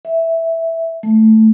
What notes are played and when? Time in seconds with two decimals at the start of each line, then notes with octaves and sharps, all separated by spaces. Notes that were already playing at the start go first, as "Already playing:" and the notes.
0.05 E5
1.03 A3